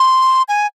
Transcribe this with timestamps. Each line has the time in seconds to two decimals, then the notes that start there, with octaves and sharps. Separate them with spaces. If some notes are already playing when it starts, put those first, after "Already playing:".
Already playing: C6
0.48 G#5